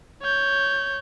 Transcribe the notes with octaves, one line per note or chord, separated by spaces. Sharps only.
C#5 G6